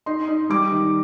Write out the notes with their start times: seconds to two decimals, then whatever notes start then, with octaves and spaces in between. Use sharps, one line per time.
0.06 D#4 C6
0.28 D#4
0.50 G3 D6
0.72 D#3